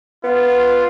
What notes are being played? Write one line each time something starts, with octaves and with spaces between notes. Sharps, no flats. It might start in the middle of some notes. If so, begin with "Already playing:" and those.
B3 F4